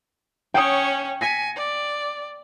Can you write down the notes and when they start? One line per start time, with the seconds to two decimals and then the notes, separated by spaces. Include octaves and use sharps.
0.54 C#4 C#5 G5 D#6
1.21 G#5 A#6 B6 C#7
1.56 D5